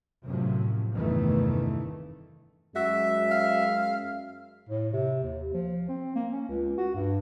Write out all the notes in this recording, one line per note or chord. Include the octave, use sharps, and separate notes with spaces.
F#2 A2 C3 F3 F#3
F1 E2 G2 D#3 E3 A3
F#2 G#3 F#4 E5
F5
A2
C3
D#2
F3
C4
A#3
C#4
C#2
F#4
G2